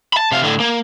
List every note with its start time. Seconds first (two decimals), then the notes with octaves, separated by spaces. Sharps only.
0.13 A5 B5
0.32 C3 F5
0.44 A2 D3
0.60 A#3